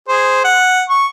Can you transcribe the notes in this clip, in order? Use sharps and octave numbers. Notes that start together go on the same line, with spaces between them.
G#4 C5
F#5
C#6